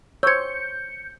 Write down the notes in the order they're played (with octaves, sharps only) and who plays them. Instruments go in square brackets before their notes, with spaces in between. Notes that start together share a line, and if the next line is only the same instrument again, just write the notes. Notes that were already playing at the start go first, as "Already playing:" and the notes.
[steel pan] C5 C#5 [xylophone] E6 G#6 [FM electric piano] G6 C#7